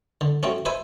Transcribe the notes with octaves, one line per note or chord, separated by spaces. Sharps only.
D3
F#3 A3 C4 C#4
B4 C5 E5 G#5